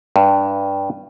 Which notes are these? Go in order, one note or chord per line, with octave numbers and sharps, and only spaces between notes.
G2